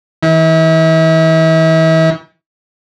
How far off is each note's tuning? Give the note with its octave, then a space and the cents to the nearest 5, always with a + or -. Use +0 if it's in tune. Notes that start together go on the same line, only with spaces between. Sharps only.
E3 -40